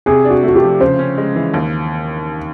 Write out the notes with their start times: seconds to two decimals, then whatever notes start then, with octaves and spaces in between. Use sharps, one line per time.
0.06 C3 G#4
0.25 D4
0.30 F#4
0.43 A3
0.48 F#4
0.56 G4
0.62 F3
0.80 C#3 C5
0.99 C#4
1.18 G#3
1.36 E3
1.54 D#2